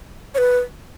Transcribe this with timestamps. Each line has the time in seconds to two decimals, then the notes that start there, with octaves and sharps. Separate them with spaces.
0.34 C#5
0.38 B4